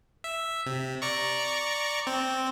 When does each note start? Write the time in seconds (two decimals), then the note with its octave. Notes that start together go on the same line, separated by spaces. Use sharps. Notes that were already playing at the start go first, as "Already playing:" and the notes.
0.24 E5
0.66 C3
1.02 D5 A#5 C#6
2.07 C4